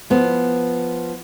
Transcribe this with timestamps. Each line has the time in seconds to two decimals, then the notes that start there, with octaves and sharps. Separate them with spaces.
0.10 F3 B3